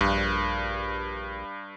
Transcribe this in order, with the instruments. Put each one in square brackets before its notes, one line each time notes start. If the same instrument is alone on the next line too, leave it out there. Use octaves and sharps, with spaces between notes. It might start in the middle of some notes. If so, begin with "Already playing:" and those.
[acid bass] A#1 [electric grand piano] G2